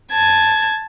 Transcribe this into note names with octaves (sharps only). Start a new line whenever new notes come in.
A5 G#6